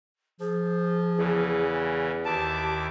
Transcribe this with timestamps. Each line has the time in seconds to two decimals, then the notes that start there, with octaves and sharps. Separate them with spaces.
0.40 F3 G#4
1.18 E2 C#3 E3
2.26 D#2 E4 G4 A5 D6